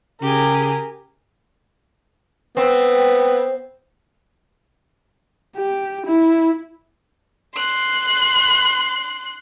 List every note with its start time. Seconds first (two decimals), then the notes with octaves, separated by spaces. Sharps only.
0.22 C#3 G4 G#4 A#4
2.57 B3 C4
5.57 G4
6.06 E4
7.56 C6 F#6